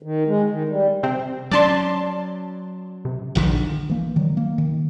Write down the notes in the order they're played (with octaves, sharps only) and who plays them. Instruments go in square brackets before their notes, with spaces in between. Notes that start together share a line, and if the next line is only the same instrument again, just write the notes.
[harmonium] D#3
G#3
D#3
G3
[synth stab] C3 C4
[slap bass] F#3 C#4 [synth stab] D5 A5 C6
[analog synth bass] C3
[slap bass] D#1 D3 D#3 [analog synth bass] A#1
[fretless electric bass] E3 A#3
D#3 F#3 G3
A#3
D#3